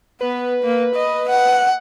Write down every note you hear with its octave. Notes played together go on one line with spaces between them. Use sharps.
B3 B4
A#3
D#5
F#5